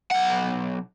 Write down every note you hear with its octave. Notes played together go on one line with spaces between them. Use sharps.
B1 F#5